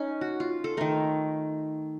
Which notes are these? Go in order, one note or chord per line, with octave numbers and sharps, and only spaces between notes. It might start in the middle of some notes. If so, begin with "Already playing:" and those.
Already playing: C#4 D#4
F#4
F4
A4
D#3 A3 A#4